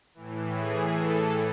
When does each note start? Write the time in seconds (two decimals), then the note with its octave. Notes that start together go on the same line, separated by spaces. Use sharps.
0.14 A2 E3
0.53 G#4
0.91 A4